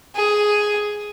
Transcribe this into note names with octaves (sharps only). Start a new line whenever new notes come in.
G#4